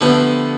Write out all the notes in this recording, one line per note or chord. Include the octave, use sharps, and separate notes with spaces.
D3 F3 A3 B3 D4 G4